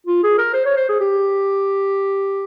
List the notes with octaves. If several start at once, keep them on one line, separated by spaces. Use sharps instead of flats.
F4
G#4
A#4
C5
C#5
C5
G#4
G4